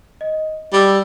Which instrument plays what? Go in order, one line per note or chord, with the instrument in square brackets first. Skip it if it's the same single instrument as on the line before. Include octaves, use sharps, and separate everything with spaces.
[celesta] D#5
[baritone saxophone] G3 [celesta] D6 E6